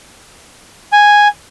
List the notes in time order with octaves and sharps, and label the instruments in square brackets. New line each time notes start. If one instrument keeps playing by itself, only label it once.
[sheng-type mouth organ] G#5